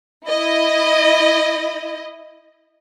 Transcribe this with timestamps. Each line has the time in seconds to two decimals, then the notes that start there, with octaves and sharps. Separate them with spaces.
0.25 E4 D#5